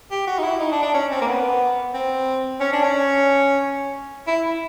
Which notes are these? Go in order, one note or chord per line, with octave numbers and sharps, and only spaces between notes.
G4
F#4
D#4
E4
D#4
D4
D4
C#4
C4
A#3
B3
C4
C#4
D4
C#4
E4